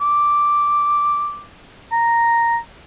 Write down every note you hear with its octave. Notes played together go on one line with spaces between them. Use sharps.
D6
A#5